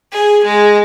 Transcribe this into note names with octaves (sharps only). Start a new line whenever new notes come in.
G#4
G#3